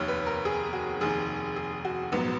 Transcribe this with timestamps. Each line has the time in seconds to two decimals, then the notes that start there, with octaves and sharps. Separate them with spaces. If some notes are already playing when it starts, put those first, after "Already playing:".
Already playing: F1 D#2 D#3 C#5
0.08 B4
0.26 A#4
0.45 G#4
0.73 F#4
1.01 F1 D#2 D#3 G#4
1.56 G#4
1.85 F#4
2.12 A#1 G#2 F#3 B3